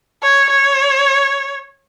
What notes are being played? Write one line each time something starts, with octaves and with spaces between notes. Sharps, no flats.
C#5
C#5